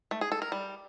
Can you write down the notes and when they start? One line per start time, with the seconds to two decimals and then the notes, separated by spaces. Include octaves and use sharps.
0.11 A3
0.21 G#4
0.32 A4
0.42 A#4
0.52 G3